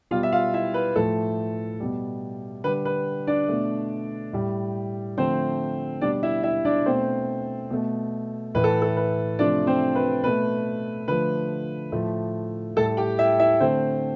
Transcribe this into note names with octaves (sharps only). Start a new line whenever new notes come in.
B2 G3 F4 F5
E5
F4 F5
E4 E5
B4
A2 F3 A3 A4
B2 G3
D3 G3 B4
B4
D4 D5
B2 A3
A2 G3
D3 F3 A3 C4 C5
B2 G3 D4 D5
E4 E5
E4 E5
D4 D5
B2 A3 C4 C5
B2 A3
A2 E3 A3 B4
A4
A4
B4
C3 F3 A3 D4 D5
C4 C5
B4
B2 A3 B4
D3 F3 A3 B4
A2 F3 A3
A2 G3 A4 A5
G4 G5
E4 E5
E4 E5
D3 A3 C4 C5